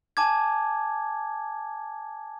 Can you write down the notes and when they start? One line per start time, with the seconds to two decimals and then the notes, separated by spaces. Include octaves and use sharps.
0.17 G#5 A5 D6 G#6